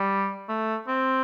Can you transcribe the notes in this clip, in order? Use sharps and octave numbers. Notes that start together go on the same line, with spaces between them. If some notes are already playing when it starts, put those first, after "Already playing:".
Already playing: G3
A3
C4